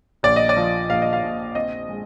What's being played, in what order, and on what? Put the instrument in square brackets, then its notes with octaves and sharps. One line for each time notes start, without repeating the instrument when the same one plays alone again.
[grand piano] A#1 D5
D#5
D5
F3
A#1 F5
D#5
F5
A#2
C4 D#5
G#3